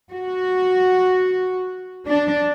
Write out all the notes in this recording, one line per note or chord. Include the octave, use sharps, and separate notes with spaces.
F#4
D4